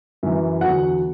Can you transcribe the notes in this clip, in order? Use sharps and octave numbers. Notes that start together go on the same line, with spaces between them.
F#2 E3
E2 D3 F#3 F#5